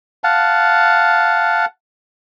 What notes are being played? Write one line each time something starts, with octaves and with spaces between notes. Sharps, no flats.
F5 F#5 A5